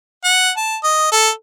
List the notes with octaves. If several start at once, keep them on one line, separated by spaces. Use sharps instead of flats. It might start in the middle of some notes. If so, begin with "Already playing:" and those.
F#5
A5
D#5
A4